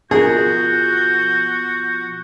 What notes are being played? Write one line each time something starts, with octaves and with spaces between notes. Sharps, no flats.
B2 F3 F#4 G#4 A#4 G6